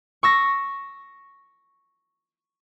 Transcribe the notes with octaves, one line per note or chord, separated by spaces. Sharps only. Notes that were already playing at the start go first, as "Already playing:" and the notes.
C#6 E6 A#6